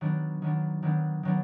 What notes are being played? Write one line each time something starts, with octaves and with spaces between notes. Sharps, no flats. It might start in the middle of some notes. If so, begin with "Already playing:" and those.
D#3 F#3 B3 D4
D#3 F#3 B3 D4
D#3 F#3 B3 D4
D#3 F#3 B3 D4